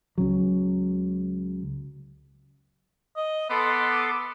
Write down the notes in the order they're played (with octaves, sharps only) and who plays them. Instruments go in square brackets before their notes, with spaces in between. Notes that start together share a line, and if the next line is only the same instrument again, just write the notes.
[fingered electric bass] C#2 C#3 F#3
[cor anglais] D#5
[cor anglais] B3 [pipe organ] A4 C6 D6